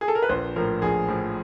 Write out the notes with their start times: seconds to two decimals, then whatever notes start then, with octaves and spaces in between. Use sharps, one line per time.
0.01 G#4
0.08 A4
0.15 A#4
0.22 B4
0.29 A#1 C5
0.56 A2 F3 A#4
0.82 A#1 G#4
1.08 A2 F3